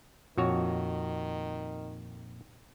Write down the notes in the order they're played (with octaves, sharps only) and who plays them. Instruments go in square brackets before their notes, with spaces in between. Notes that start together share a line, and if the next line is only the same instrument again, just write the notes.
[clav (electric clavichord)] F2 F#4 C#5 [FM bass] A#2 [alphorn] D#3